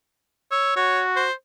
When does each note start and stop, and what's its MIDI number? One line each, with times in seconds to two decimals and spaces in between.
0.51 0.72 73
0.51 0.73 88
0.76 1.24 66
0.76 1.02 73
1.16 1.33 72